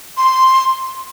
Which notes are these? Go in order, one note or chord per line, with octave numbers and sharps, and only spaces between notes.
C6